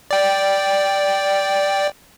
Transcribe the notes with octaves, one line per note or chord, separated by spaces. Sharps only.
D5 G5